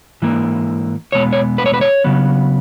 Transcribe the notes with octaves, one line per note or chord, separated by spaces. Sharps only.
G#2 E3 A#3
E2 B2 G#3 B3 C#5
C#5
B4
C#5
B4
C#5
C#3 F#3 B3